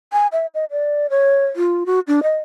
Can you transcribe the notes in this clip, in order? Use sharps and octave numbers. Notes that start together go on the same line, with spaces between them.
G#5
E5
D#5
D5
C#5
F4
F#4
D4
D#5